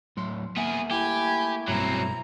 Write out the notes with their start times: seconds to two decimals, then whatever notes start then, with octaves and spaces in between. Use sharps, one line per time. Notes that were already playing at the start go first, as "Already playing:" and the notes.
0.17 A2 F#3 C6
0.57 A#3 B3 G#4 E5 F#5
0.91 A3 E4 G4 G#5
1.68 B1 G2 F#3 C4 A#5